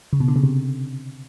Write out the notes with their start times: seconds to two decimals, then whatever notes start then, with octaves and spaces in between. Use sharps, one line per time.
0.13 C#3
0.20 B2
0.28 D3
0.36 C#3
0.43 C3